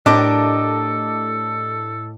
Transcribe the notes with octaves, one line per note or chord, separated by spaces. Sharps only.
A2 D4 G4 A4 A#4 D#5 A5 D6